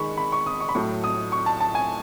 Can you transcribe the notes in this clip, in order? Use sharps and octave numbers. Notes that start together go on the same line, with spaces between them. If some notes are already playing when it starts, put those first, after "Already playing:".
Already playing: D#3 G#3 B5 C#6
B5
C#6
D#6
C#6
B5
A2 F#3 A3 C#6
D#6
C#6
A5
A5
G#5